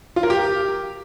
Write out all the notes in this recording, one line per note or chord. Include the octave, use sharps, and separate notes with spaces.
F4
A#4
G4